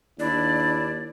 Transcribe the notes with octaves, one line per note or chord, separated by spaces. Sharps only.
D#2 D4 E4 D5